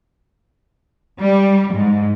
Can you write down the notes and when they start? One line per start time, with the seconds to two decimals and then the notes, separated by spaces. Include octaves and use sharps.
1.21 G3
1.75 G#2